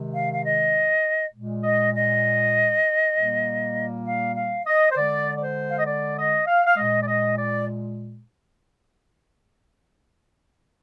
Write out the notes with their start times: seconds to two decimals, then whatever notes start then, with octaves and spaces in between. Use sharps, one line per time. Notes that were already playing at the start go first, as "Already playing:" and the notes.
Already playing: C3 D#3 G#3
0.13 F5
0.33 F5
0.44 D#5
1.33 A#2 G#3
1.63 D#5
1.94 D#5
3.15 A#2 G3 A#3
4.05 F5
4.36 F5
4.67 D#5
4.91 C5
4.96 D3 G#3 D5
5.37 D5
5.42 C5
5.70 F5
5.79 D#5
5.87 D5
6.18 D#5
6.47 F5
6.66 F5
6.77 A#2 G#3 D#5
7.03 D5
7.08 D#5
7.38 D5